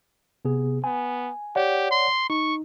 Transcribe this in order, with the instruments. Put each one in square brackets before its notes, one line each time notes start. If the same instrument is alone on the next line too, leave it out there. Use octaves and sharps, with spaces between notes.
[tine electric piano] C3 B3 G#4
[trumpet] B3 [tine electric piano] G#5
[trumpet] G4 [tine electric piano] C#5 D5 F#5
[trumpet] C6
[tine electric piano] D#4 [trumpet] C#6